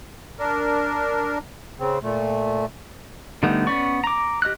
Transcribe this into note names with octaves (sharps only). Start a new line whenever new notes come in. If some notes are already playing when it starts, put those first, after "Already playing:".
D4 A#4
C#3 C4
A#2 A3
D3 G3 A3 B3 D#4
B3 C#4 D5 C#6
A#5 D6
G4 D#5 F6 F#6